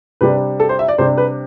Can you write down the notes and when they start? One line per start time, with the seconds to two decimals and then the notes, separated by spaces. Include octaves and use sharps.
0.21 C3 G3 D4 B4
0.60 A4
0.69 C5
0.79 E5
0.88 D5
0.98 C3 G3 D4 C5
1.18 B4